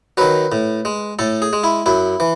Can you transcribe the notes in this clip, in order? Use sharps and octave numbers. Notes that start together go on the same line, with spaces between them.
D#3 F#3 B4
A2
G#3
A2 A4
G#4
G#3
E4
F#2 E4
E3